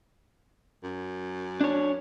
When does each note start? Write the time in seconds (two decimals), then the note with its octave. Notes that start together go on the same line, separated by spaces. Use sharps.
0.83 F#2
1.61 D4 C#5